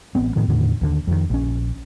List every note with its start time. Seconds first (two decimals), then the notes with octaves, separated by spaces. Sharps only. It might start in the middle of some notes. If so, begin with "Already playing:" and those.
0.15 A1 B3 C4
0.36 A2 D#3 F3
0.48 E2 A2 D3 D#3
0.82 D#2 D3
1.07 F2 D#3
1.30 A#1 C#4